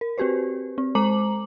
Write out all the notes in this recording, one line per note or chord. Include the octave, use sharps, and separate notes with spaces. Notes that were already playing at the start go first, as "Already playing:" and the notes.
A#4
C4 F#4 G4 B4 C5
C4
G#3 C5 A#5 D6 F#7